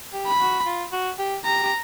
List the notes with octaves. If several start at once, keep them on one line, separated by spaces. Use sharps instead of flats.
G4
B5
F#4
F4
F#4
G4
G4 A#5
G4